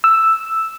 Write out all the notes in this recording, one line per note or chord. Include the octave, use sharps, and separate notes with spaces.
E6